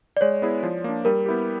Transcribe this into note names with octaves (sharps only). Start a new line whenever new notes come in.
D5
G#3 C#5
B3 E4 G#4
F3
A#3 D4
G3 A#4
B3 E4 G4